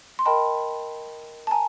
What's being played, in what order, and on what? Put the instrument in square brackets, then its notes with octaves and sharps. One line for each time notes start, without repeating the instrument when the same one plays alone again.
[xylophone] C6
A#4 D#5 G5 A5 B5
A5
G#5 A#5